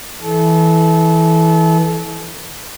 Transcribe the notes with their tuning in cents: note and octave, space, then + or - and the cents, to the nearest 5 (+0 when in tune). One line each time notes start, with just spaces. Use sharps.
E3 -10 A4 -30